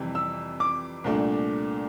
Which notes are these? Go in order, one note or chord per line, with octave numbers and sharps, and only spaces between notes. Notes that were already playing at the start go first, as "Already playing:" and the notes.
Already playing: F2 C3 E3 G3
E6
D6
C2 A#2 A3 D4